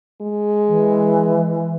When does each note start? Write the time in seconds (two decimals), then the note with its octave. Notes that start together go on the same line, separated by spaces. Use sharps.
0.21 G#3
0.68 E3